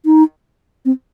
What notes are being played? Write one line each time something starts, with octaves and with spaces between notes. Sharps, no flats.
D#4
C4